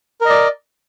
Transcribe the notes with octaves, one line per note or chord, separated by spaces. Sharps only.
A#4 D5 D#5